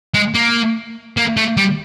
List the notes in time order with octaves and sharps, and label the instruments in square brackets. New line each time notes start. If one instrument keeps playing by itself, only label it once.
[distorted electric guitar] G#3
A#3
A#3
A3
G3